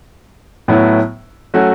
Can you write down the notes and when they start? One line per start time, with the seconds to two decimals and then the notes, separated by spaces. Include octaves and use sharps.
0.68 A2 F#3 B3 E4
1.54 F#3 A3 C#4 F#4